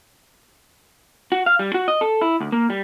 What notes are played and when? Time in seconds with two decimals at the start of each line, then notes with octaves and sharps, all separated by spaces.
1.32 F#4
1.46 F5
1.59 G3
1.74 F#4
1.88 D#5
2.01 A4
2.22 E4
2.41 D2
2.52 A#3
2.70 G3